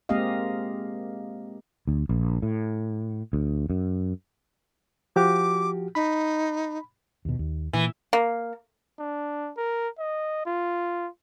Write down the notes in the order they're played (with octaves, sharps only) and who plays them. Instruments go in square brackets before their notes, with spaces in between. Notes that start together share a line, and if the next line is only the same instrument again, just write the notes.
[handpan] G#3 A#3 C4 G4 D#5 F5
[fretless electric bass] D2
A#1
A2
D2
F#2
[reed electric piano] F3 F#4 G4 [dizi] D6
[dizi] D#4 [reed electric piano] B5
[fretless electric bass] D#2 B2
D#2
[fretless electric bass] A#2 [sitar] E3
[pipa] A#3
[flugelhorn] D4
A#4
D#5
F4